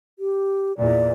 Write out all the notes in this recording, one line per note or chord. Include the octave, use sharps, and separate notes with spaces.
G4
E2 A#2 D5